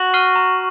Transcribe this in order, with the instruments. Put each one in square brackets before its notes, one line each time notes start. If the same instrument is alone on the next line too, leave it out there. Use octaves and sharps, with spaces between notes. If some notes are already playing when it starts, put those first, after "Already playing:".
Already playing: [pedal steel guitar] F#4
[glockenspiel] C#6 F6 C7 D#7
A#5